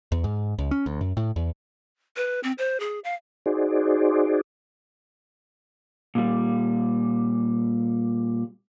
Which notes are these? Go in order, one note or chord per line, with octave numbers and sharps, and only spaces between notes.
E2
G#2
C#2
C#4
D2
F#2
A2
E2
B4
C4
C5
G#4
F5
D#4 F#4 G#4 C5 D5
A#2 G3